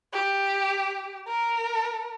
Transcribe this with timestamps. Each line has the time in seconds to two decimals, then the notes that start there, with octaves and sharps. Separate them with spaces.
0.13 G4
1.27 A#4